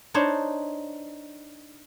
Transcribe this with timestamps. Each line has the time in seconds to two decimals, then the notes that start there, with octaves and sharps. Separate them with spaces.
0.14 D4 D#4 C5 C#5